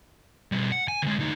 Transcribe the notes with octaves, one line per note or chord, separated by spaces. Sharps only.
B2 G3
F#5
G#5
D2 G#3
D2 D#4